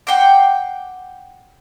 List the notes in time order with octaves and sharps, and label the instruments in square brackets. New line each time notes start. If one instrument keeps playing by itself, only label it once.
[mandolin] F#5 G5 C6 D6